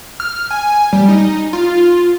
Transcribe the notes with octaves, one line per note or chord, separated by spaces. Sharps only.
F6
G#5
G3
D#4
F4